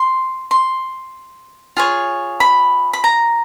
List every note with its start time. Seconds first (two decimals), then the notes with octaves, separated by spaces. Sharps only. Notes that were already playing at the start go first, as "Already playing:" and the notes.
Already playing: C6
0.51 C6
1.77 F4 G#4 C#5
2.40 B5
2.93 B5
3.04 A#5